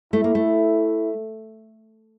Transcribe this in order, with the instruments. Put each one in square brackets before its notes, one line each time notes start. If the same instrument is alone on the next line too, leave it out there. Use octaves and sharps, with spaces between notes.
[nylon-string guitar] A3 [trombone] E4
[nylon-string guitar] A#3
A3